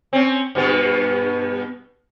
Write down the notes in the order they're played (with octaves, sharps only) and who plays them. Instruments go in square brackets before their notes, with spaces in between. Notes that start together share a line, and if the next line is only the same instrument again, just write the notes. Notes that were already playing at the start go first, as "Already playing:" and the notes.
[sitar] C4 C#4
G2 B2 B3